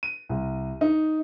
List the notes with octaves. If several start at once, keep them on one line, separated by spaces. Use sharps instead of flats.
D#7
C2
D#4